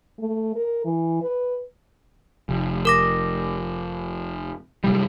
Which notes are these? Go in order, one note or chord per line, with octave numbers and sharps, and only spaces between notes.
A3
A#4
E3
B4
F1
A#4 D6 A#6
F#2 C3 G3